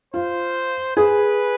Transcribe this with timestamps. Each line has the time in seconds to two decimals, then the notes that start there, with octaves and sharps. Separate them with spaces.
0.14 F4 C5
0.97 G#4 B4